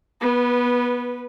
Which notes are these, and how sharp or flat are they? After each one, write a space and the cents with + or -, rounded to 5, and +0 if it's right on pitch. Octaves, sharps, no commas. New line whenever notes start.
B3 -20 B4 +0